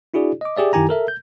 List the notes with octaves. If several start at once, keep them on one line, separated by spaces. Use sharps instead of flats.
D4 E4 F#4 G#4 D5
D#5 D6
G4 G#4 D5 E5
F#2 D#3 E4 G4 G#5 A#5
A4 A#4 E5
G6